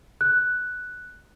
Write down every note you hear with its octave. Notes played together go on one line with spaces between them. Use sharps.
F#6